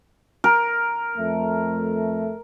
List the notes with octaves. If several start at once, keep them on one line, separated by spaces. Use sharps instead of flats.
A#4
F2 A3